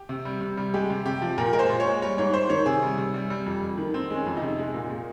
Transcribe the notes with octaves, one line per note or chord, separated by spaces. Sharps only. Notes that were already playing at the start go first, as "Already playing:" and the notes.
Already playing: G4
C3
G3
C3
G3
G#3 G4
C3
C3 G4
F3
A#2 A#4
G#3 A#4
C5
A#2
C#5
G#3
G3 C#5
G#2 C#5
G#2 C5
D#3 C#5
C3 G#4
G3
C3
G3
G3
F2
F2
D#3
D#3 C4
G#3 C#4
F2
C3 D#4
G#3
A#2
A#2